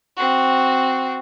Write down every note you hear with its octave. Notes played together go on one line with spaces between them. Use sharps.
C4 F#4